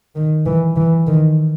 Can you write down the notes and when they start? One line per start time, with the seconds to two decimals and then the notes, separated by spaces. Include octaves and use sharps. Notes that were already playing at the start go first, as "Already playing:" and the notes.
0.15 D#3
0.46 E3
0.76 E3
1.07 D#3